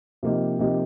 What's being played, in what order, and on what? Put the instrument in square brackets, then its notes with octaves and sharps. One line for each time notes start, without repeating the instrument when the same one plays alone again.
[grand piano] C3 F3 A#3 D#4 G4
C3 F3 A#3 D#4 G4